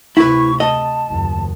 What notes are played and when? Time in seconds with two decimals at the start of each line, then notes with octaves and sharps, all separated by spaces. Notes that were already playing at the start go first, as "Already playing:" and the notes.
0.17 D2 C3 E4 B4 C#6
0.60 D#5 A5
1.08 F#1 D#2